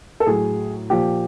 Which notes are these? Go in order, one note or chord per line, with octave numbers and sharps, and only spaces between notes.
A4
A2 F#3 G#4
A#2 F3 G4